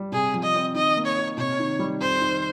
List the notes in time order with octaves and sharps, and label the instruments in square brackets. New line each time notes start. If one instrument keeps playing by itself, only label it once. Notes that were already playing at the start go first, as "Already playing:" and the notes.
Already playing: [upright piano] G3
[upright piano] C3 [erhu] G#4
[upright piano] F3
[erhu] D#5
[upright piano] C4
[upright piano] D#3 [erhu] D#5
[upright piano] A#3
[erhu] C#5
[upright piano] D#4
[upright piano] C3 [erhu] C#5
[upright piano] D#3
G3
[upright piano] F2 [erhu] C5
[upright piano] D#3